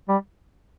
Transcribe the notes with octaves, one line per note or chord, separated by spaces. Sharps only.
G3